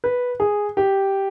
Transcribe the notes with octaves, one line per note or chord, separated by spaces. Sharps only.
B4
G#4
G4